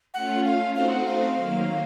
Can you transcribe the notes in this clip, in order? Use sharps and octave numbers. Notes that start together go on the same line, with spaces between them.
A3 C#4 F4 F#5
F5
A3 C4 D#4 F#4 C5 F5
F#5
F5
D#3 F#3 A#3